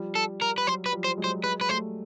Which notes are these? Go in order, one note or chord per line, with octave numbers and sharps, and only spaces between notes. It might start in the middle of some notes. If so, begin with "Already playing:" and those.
Already playing: F3 G3
A4
A#4
B4
F#3 C5
B4
F3 G3
C5
F#3 G#3
C5
F#3 G#3 B4
B4
G3 A3 C5